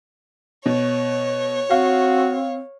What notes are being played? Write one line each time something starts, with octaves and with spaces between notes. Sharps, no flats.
B2 C#5
C4 F#4 F5